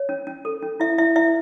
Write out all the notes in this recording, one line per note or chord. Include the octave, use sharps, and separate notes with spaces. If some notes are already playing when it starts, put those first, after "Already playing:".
Already playing: C#5
C#4
C#4
A4
C#4
E4 E5
E4 E5
E4 E5